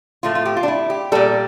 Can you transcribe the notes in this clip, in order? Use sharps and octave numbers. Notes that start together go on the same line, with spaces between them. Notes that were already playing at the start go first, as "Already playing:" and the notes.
A2 F3 A3 F4
F4
G4
F4
D4
E4
G4
A#2 G3 A4